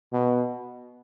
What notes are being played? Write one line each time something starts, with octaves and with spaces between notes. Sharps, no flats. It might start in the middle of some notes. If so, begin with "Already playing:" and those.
B2